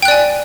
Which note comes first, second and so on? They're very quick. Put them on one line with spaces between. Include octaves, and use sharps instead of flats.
G5 F#6 D5 G#5